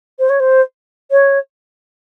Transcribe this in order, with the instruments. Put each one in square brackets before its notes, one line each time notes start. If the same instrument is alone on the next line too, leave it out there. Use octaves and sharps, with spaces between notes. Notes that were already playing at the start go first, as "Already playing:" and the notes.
[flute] C5
C#5
C5
C#5